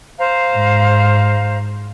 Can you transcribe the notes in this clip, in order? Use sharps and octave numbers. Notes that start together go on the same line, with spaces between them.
C5 F5 A#5
G#2